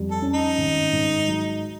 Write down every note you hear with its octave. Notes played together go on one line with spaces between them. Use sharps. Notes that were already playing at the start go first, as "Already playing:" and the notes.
Already playing: F2 G3
A4
C#4
D#4
G#1
G#2
F#3